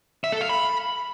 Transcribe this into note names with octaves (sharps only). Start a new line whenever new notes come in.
E5
A4
F5
B5